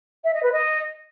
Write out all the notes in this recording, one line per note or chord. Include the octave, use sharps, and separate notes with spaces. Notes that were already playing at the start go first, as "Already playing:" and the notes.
E5
D#5
B4
D#5